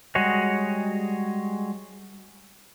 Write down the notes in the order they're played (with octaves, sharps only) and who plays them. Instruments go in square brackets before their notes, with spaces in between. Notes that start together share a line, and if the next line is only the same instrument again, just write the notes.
[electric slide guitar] G3 G#3 F#4 G#4 C#5 D#5